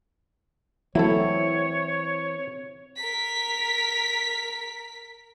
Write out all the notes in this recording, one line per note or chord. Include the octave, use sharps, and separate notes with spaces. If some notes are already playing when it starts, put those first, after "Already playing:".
E3 F#3 A3 C4 E4 A4 C#5
A#4 B6